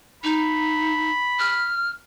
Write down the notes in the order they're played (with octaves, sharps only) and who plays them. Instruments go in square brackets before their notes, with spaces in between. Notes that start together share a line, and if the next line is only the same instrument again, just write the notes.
[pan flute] D#4 [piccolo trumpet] B5
[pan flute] F6